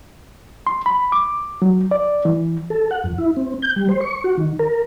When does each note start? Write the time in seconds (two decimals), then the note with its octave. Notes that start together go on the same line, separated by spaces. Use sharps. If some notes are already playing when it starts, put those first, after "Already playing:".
0.67 C6
0.86 B5
1.12 D6
1.62 F#3
1.91 D5
2.25 E3
2.70 A4
2.91 F#5
3.04 F2
3.18 E4
3.36 C4
3.62 G6
3.76 G3
3.89 C5
4.01 C#6
4.24 F#4
4.37 D#3
4.59 A#4